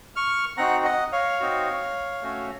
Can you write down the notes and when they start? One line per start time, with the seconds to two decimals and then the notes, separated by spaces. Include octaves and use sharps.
0.16 C#6 F6
0.57 C4 D#4 F#4 F#5 A#5
0.85 D#5 F#5
1.12 C#5 F5
1.40 C4 D#4 F#4
2.22 A3 C#4 F#4